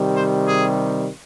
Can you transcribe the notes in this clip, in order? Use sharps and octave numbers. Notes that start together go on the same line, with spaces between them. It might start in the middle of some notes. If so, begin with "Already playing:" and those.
Already playing: C3 D#3 G3
C5
G#4